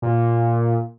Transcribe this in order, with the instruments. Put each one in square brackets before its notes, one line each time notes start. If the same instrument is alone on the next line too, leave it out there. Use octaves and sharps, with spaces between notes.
[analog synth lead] A#2